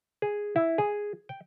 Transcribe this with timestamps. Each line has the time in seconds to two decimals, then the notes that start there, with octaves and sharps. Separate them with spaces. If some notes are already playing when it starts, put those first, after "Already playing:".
0.22 G#4
0.56 E4
0.78 G#4
1.29 G5